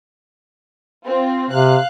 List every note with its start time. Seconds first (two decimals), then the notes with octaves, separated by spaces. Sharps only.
1.06 C4 F4
1.51 C3 F5 F#6